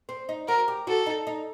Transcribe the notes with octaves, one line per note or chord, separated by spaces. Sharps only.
C4
D#4
F#4 A#4
G4
F#4 A4
D#4
D#4